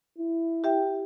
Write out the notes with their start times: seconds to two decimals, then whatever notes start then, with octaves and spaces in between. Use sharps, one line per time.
0.18 E4
0.64 G4 E5 G5